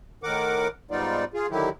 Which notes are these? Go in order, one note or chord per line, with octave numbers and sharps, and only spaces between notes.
A2 D#3 A#4 F#5 D6
G#2 G3 B3 D#4 F4 D5
F4 G#4
D3 D#3 F#3 E4 G4